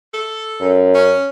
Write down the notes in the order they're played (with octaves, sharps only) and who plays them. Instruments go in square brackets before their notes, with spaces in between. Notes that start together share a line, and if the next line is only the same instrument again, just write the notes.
[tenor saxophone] A4
[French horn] F#2
[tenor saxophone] C#4